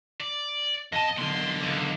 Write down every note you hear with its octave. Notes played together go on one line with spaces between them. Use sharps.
D5
F2 D#5 A5
B1 D3 C6
C#2